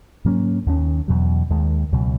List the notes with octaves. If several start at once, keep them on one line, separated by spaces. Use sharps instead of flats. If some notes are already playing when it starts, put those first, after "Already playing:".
G#2 F#3 A#3 C#4
D#2 D#3 A#3 C#4
E2 B2 F#3
D#2 D#3 G#3
C#2 B2 F#3